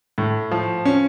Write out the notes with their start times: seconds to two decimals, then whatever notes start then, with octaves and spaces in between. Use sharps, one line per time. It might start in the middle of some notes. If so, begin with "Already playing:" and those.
0.18 A2
0.51 F3
0.85 C#4